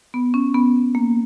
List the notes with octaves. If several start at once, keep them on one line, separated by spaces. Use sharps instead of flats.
B3
C#4
B3
A#3